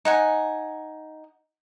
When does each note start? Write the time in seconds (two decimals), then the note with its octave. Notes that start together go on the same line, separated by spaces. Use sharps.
0.05 D#4 F#5 G#5